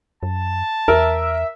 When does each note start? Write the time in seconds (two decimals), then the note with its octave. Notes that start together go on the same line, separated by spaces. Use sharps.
0.23 F#2 A5
0.88 E2 A#4 E5